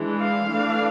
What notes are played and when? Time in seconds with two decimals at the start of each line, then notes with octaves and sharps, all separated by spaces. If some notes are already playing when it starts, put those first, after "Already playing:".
Already playing: E3 G#3 D4
0.19 F5
0.47 E3 A3 D4